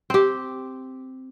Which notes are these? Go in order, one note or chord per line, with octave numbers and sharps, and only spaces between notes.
C4 G4